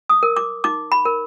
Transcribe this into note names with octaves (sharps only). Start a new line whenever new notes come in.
D#6
A#4
D6
D#4 D6
B5
A#4